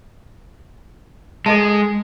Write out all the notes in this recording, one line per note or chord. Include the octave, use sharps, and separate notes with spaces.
G#3 A4 D#5 A5